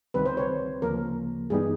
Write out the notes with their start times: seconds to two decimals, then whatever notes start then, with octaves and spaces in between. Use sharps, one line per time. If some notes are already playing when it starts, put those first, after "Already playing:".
0.14 C#2 C3 D#3 G3 C4 B4
0.26 C5
0.37 B4 C#5
0.82 D2 C#3 F3 A#3 A#4
1.50 G2 E3 G3 B3 D#4 G#4